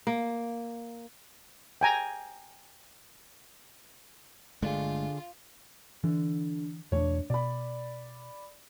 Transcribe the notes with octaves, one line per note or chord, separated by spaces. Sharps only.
A#3
G5 G#5 A#5
G1 D3 G#3 A3 D4 F4 G#4
D3 E3
E2 B2 A3 D4 C#5
B2 D5 B5